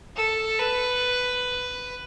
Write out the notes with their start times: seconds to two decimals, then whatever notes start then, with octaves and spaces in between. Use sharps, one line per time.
0.16 A4
0.59 B4